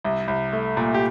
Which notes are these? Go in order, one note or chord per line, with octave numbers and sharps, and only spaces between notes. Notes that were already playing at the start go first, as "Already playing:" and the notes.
C2
C2
A3
A#2
G4